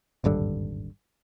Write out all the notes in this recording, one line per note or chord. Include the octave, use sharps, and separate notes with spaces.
D#1 G#1 G2 D3